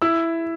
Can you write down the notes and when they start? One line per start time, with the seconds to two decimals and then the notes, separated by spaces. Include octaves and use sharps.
0.02 E4 E6